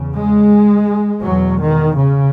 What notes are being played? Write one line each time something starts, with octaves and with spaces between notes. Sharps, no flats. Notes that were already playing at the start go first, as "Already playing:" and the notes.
Already playing: E2 C#3
G#3
E2 B2 F#3
D#3
C#3